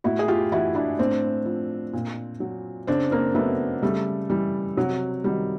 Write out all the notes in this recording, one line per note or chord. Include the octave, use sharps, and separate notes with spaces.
A2 E4 F#4
G#4
F4 G4
E3 E4 F#4
D4 E4
A2 C4 D4
F3
A#2
F#3
C#3 C4 D4
A#3 C4
F#3 A3 B3
C#3 G3 A3
E3 G3
C3 F#3
D#3 F#3 G3